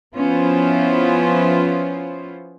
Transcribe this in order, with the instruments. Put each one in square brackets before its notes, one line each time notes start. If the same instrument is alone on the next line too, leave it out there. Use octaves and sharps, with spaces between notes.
[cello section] F3 B3 C#4 E4 F4 C5